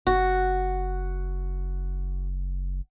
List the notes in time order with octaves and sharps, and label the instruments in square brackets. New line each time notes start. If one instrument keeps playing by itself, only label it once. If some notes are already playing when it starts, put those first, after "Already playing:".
[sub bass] F#1 [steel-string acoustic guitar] F#4